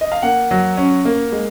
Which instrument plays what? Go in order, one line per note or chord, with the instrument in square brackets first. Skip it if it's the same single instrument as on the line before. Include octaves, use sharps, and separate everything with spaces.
[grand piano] D#5
F5
A#3 F#5
F#3
C#4
A#3
G#3